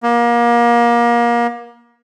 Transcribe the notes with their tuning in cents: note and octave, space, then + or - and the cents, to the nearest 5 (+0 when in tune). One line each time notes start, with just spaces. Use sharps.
A#3 +30